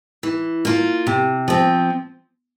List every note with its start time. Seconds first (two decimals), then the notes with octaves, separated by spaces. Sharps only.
0.23 E3
0.65 A#3 F4
1.07 C3
1.48 F3 C4